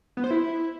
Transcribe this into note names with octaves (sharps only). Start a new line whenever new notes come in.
B3
C5
E4